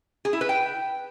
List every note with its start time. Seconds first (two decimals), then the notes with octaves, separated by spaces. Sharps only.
0.25 G#4
0.33 E4
0.41 B4
0.49 G5